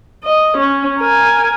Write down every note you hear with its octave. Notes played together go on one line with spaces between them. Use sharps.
D#5
C#4
A#4 G#5